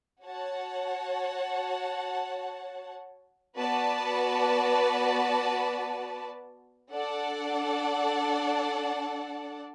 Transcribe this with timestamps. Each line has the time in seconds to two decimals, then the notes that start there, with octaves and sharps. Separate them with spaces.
0.24 F#4 C#5 F#5 A5
3.58 B3 F#4 B4 D5 A5
6.92 D4 A4 D5 F#5 A5